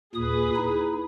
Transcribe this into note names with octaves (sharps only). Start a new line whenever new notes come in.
D#2 A#2 G#4 B4 D#6
D#4 E4